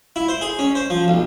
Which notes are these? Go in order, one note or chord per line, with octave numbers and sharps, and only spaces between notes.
E4
C5
G#4
C#4
C5
F3
B1